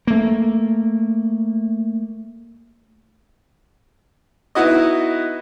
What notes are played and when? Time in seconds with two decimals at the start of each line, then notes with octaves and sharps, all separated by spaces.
0.07 A3 A#3
4.55 B3 D#4 E4 F#4 D#5